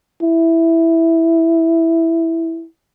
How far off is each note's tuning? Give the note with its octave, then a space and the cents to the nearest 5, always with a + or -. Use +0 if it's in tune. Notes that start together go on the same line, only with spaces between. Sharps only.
E4 +0